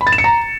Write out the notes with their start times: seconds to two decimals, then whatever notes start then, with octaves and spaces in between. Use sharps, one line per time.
0.01 B5
0.07 A6
0.12 E7
0.18 C#7
0.24 A#5